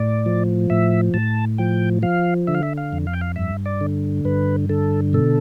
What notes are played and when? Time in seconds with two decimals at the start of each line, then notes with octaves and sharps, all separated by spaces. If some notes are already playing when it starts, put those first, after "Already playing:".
Already playing: A2 D5
0.26 F3
0.70 A2 E5
1.14 A2 A5
1.58 F3 G5
2.03 F3 F5
2.47 D3 E5
2.55 F5
2.63 E5
2.77 F5
2.92 F2
3.07 F5
3.13 G5
3.21 F5
3.36 G2 E5
3.66 D5
3.81 D3
4.25 G2 B4
4.69 D3 A4
5.13 B2 A4